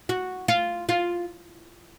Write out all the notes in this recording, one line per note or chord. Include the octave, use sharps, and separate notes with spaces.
F#4
F4
F4